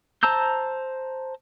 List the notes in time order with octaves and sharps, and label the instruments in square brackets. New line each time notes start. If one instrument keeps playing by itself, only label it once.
[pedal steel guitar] C5 A5 A#5 E6 G6